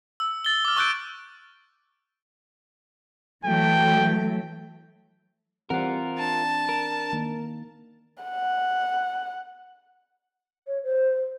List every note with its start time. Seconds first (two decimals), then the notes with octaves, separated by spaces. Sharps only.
0.20 E6
0.45 A6 G7
0.65 D6 F6
0.76 C#6 E6 F#6 G6 D7
3.45 E3 F#3 A3 G5
5.70 E3 G3 C4 F4 A#4 F#5
6.19 D4 A5
6.69 A#4
7.13 D#3 A#3
8.23 F#5
10.67 C#5
10.84 C5